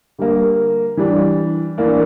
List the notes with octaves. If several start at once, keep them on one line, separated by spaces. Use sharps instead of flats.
D3 G3 A#3
E3 G3 D4
E3 A#3 D4